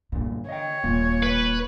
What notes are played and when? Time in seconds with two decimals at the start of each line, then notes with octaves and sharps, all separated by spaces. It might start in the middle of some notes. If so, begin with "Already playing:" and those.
0.12 B1 G2 A#2 D3
0.49 C#5 D#5 E5 G5
0.84 D#1 A#3 F4
1.23 B4